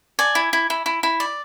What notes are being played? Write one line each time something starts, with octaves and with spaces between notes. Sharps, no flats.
D5 G#5
E4
E4
E4
E4
E4
D5